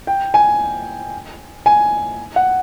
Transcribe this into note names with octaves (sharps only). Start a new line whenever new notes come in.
G5
G#5
G#5
F#5